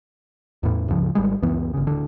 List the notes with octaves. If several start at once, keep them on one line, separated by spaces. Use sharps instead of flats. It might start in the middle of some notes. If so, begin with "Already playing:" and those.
E2 A2
C#2 G2 C#3 F3
G#1 G3 G#3
C#2 F#2 E3 B3
G1 C#3
D1 D3